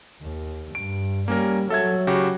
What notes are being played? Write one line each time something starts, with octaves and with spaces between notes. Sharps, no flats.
D#2
G2 D7
G3 A#3 C#4 A#4
F#3 A4 E5 G#6
C#3 F#4 G4